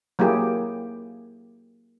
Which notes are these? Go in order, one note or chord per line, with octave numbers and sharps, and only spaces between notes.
F#3 A#3 E4 G4 G#4